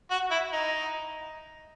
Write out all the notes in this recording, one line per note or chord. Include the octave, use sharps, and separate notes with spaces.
F#4
E4
D#4